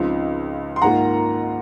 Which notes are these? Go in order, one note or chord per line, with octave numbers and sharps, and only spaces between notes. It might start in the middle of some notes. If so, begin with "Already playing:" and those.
Already playing: C#2 C#3 F3 C4 D#4
C6
G#2 D#3 A#3 F4 F#5 A#5